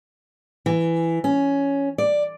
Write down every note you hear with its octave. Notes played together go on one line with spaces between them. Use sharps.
E3
C#4
D5